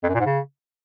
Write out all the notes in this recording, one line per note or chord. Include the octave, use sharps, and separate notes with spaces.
F2
F#2
A#2
G#2
C#3